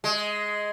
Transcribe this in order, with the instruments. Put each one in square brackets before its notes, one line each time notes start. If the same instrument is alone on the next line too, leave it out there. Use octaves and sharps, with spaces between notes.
[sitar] G#3